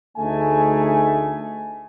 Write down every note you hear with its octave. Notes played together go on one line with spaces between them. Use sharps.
D2 A3 D#4 G#4 G#5